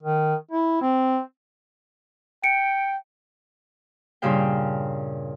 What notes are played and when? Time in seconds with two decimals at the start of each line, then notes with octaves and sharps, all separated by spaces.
0.03 D#3
0.52 E4
0.82 C4
2.44 G5 C#7 D7
4.22 G2 A#2 C#3 G#4 F5 G5